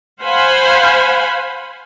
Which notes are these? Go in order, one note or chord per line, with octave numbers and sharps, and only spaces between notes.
C5 F5 F#5 G#5 B5